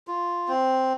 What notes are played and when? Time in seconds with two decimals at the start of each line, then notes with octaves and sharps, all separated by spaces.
0.08 F4
0.48 C4